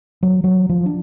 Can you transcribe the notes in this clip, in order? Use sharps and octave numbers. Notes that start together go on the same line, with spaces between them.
F#3
F#3
F3
D4